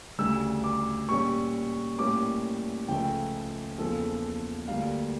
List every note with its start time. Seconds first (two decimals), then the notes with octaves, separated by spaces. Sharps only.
0.19 D2 C#3 G3 E6
0.64 D6
1.09 A#2 G3 C#4 C#6
1.99 A2 G3 A#3 C#4 D6
2.88 C#2 C#3 F3 A3 G5
3.78 E2 C#3 F3 A#3 A4
4.68 D2 D3 G3 A#3 F5